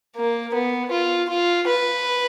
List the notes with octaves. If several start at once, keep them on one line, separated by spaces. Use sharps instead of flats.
A#3
B3
F4
F4
B4